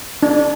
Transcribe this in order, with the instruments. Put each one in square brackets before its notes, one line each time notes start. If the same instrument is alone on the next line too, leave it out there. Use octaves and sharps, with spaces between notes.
[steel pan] D4